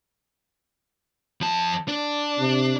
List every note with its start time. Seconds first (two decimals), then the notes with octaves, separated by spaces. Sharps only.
1.41 F2 A5
1.88 D4
2.39 C3